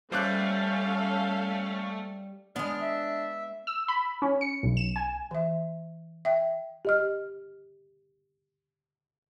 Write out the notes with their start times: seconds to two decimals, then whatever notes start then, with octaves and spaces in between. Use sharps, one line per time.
0.12 G3 A3 C#4 A4 C5 F5 D6 F#6
2.56 G#3 B3 D4 F6
2.81 E5
3.67 E6
3.88 B5
4.22 C#4
4.41 C#7
4.63 B1
4.77 E7
4.96 G#5
5.31 E3 E5
6.25 E5 G5
6.85 G4 D#5 F6